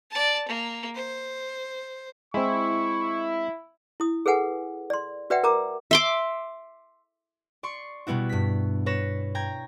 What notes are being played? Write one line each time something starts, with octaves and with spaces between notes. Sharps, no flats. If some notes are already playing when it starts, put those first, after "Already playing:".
D5 A5
A#3
C5
G#3 C4 E4 C#6
E4 D#6
G#4 A4 B4 F#5 G#5
D5 C6
F#4 B4 D5 E5 F#5 G5
A#4 A#5 D6 E6
E5 C6 D6
D5 C6 C#6
B2 G3 B3 E4 F#4
G2 B6
B4 C#5 A#6 E7
G5 A#5 G#6